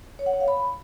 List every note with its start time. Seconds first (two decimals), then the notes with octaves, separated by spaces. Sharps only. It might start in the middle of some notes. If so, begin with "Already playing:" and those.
0.19 C#5
0.26 F#5
0.33 C#5
0.41 F5
0.48 B5